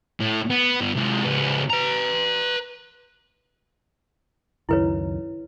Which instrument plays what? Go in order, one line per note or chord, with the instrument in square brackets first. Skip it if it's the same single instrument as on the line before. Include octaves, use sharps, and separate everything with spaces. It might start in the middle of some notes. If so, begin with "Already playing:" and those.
[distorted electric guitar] A2
B3
G2 B3
C3 G#3
C#2 B3
B4 A#5
[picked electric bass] C#2 F#2 D#3 [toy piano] E4 B4 C#5